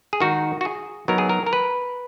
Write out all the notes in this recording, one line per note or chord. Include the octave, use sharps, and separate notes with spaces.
G#4
D#3 G#3 D#4 F#4
F#4
G#4
F#3 B3 D#4 A#4
G#4
A#4
A#4
B4